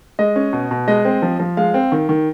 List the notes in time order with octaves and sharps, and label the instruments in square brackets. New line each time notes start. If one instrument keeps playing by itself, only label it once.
[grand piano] G#3 D#5
C#4
B2
B2
G#3 D#5
C4
F3
F3
G#3 F5
C4
D#3
D#3